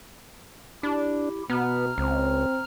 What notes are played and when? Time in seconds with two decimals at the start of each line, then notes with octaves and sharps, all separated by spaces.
0.83 D4 E4 G4
1.50 B2 B3 A#5 F6
1.98 C#2 C4